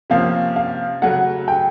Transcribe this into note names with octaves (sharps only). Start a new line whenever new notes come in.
C3 F3 A#3 C#4 F5
F5
C#3 F#3 A3 F#5
G5